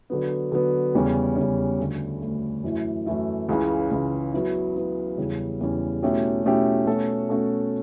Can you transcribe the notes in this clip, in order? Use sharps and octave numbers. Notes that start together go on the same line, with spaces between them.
D3 F#3 B3
D3 F#3 B3
E2 C#3 G3 C#4
E2 C#3 G3 C#4
D2 D3 A3
D2 D3 A3
F#2 E3 A3 E4
F#2 E3 A3 E4
C#2 C#3 E3
C#2 C#3 E3
F#3 B3 E4
F#3 B3 E4
E2 C#3 E3 G3 C#4
E2 C#3 E3 G3 C#4
B2 A3 C#4 E4 G4
B2 A3 C#4 E4 G4
B2 A3 C#4 F#4 A4
B2 A3 C#4 F#4 A4